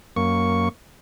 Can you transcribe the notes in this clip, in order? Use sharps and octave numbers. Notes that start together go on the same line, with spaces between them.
F#2 A#3 C#6